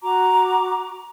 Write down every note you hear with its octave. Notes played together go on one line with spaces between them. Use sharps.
F#4 A#5 D6